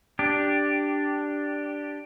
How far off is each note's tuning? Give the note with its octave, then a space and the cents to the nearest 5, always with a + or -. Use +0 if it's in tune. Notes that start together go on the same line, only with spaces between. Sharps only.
D4 +0 G4 +0